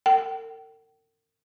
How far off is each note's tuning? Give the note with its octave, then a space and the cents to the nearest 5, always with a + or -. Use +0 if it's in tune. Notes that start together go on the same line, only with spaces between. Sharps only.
A#4 -45 G5 -30